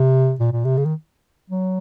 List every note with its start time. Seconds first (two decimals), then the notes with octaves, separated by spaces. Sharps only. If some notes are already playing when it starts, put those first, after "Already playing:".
Already playing: C3
0.40 A#2
0.52 A#2
0.65 C3
0.77 C#3
0.86 D#3
1.50 F#3